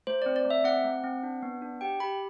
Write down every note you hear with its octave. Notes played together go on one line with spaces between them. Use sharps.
A3 C5
C4 D5
D5
A3
E5
C4 F#5
A3
C4
D4
B3
D4
G4 G5
G4 B5